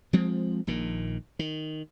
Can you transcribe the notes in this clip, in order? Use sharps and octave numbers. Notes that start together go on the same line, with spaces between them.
F3 G#3 C4
A#1 A#2 D#3
D#3